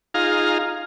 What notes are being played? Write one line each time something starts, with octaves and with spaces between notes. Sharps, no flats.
D#4 F4 G#4 F5 A#5